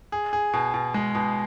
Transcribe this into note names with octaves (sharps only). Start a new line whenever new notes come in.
G#4
G#4
B2
B2
G#3
B2